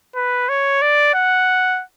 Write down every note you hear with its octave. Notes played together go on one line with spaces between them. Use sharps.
B4
C#5
D5
F#5